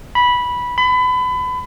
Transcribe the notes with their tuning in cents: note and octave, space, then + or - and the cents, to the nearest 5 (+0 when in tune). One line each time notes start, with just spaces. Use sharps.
B5 -10
B5 +30